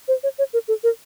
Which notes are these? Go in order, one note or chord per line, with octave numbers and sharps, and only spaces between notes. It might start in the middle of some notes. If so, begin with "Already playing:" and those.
C5
C#5
C#5
A#4
A4
A#4